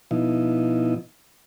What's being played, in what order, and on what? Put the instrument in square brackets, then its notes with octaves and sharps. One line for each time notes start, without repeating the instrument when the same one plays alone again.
[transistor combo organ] B2 F3 D#4 E4